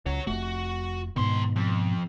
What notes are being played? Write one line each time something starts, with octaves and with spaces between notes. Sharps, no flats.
C#2 C#5 F#5
F1 A3 F#4
G#2 B2 D#3 C6
F2